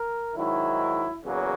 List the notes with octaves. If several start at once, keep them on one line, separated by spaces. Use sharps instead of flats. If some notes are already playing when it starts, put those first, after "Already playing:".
Already playing: A#4
G#2 D#3 F#3 E4
E2 C#3 F#3 A#3